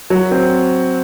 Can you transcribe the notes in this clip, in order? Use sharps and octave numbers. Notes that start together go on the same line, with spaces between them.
F#3
C4